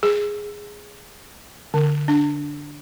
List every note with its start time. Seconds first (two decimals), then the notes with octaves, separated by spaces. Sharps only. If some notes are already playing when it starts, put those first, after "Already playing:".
0.03 G#4
1.74 D3
2.08 D4